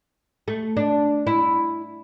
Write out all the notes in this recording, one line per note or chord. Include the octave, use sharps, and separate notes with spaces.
A3
D4
E4